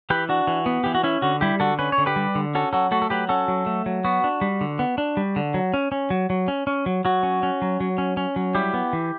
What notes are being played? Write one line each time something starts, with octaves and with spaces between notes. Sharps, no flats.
E3 G4 B4
D4 F#4
E3
B3
E3 G4
F#4
C#4 E4
D3 F#4
G3 E4 G4
D3 F#4 A4
C#4 B4
C#5
D3
G4 B4
G3
D3
C#4 F#4 A4
F#3 F#4 A4
A3 F#4 A4
A4
F#3 G4 B4
C#4 F#4 A4
F#3
A3
F#3
B3 F#4
D4
G3
D3
B3
D4
G3
D3
F#3
C#4
C#4
F#3
F#3
C#4
C#4
F#3
F#3 F#4
C#4
C#4
F#3
F#3
C#4
C#4
F#3
G3 E4 G4
B3
E3